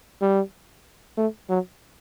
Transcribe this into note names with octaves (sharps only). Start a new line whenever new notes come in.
G3
A3
F#3